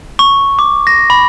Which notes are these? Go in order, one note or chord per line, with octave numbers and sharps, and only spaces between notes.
C#6
D6
A#6
B5